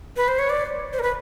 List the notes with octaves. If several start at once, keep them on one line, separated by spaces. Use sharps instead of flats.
B4
C5
C#5
D5
C5
A#4
B4